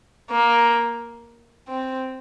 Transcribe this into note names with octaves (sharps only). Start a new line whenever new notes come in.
A#3
C4